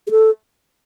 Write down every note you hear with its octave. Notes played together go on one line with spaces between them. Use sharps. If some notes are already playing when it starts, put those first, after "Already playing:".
G#4
A4